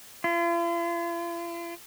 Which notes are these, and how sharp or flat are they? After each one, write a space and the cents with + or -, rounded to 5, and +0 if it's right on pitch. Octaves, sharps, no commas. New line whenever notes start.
F4 -45